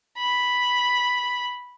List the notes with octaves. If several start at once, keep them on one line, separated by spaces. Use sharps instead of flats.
B5